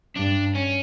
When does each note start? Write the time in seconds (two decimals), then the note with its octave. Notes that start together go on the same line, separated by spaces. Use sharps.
0.16 G2 D4
0.55 C#4